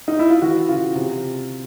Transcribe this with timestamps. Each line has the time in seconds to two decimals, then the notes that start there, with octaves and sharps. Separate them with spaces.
0.08 D#4
0.19 E4
0.30 F4
0.42 E3 F#4
0.69 C#3 F4
0.95 C3